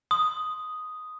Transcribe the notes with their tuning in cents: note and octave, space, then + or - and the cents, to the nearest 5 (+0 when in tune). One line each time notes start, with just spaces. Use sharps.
C6 +0 D#6 +0